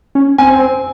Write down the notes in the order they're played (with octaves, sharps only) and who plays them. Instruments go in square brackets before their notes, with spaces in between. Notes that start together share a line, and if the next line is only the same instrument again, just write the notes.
[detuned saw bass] C#4
[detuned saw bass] C4 [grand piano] G#5